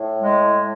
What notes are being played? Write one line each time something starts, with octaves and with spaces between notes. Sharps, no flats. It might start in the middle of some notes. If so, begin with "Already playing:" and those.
Already playing: A2
G#3